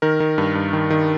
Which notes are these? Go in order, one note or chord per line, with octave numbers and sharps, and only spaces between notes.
D#3 A#4
D#3
G2
G2
D#3
D#3